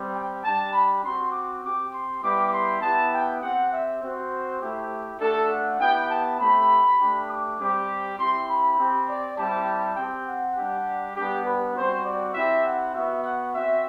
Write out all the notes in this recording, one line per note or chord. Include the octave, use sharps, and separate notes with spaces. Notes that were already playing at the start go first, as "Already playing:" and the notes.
Already playing: G3 C4 G4
G5
G3 D4 G4 A5
B5
C4 F#4 C6
D6
C4 G4 D6
C6
G3 B3 E4 G4 D6
C6
B3 E4 G4 A5
G5
C4 G4 F#5
E5
C4 F#4 C5
A3 E4 G4
A3 D4 F#4 A4
F#5
B3 E4 G4 G5
A5
A3 C4 G4 B5
A3 D4 G4
D6
G3 C4 G4
C4 E4 G4 C6
B5
C4 G4
D5
G3 C4 E4 G4 A5
C4 G4 G5
F#5
G3 D4 G4
G3 B3 D4 G4
B4
G3 C4 F#4 C5
D5
C4 E4 G4 E5
F#5
B3 F#4 E5
F#5
C4 F#4 E5